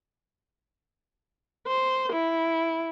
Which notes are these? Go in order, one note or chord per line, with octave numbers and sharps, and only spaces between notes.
C5
E4